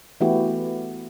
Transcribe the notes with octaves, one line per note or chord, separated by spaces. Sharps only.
E3 A3 B3 E4 F#4 G4